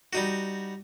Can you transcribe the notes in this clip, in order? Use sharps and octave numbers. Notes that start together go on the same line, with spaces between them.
G3 D#4 F#4